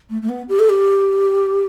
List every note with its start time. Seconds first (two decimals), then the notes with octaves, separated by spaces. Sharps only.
0.10 A3
0.22 A3
0.29 B3
0.49 G4
0.59 A4
0.70 G4